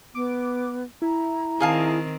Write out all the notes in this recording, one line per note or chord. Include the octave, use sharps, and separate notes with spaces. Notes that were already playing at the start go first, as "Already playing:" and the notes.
B3 D6
E4 A#5
D#3 C4 G#4 F5 A5